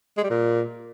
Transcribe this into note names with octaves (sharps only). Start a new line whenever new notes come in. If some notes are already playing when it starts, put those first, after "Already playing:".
G#3
G3
A#2